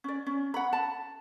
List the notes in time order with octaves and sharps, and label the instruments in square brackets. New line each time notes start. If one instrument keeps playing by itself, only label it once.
[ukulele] C#4 D5
C#4
F#5 B5
A5